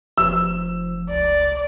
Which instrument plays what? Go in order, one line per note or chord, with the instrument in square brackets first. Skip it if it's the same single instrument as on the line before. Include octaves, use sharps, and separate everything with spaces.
[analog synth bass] F1 [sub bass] F3 [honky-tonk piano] E6
[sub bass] C#2 [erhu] D5